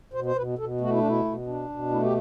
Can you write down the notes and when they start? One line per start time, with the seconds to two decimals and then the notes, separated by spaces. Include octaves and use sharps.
0.14 B2 C5
0.26 C5
0.36 B2 B4
0.58 B2 A4
0.81 A3 F#4
0.90 E4
0.99 D4
1.03 B2 E4
1.25 B2
1.47 D4
1.69 B2
1.91 A3 E4
2.03 G4